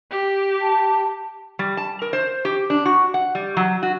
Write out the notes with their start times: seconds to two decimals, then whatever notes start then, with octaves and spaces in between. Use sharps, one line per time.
0.11 G4
0.61 A5
1.59 G3
1.77 A5
2.02 A#4
2.13 C5
2.45 G4
2.70 D4
2.85 F#4
3.14 F#5
3.35 G3
3.57 F#3
3.83 F#4